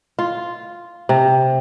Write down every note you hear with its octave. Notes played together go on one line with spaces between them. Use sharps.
F4
C3